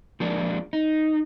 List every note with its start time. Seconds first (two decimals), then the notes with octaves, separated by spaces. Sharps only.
0.20 F3 G#3 A#3 D4
0.73 D#4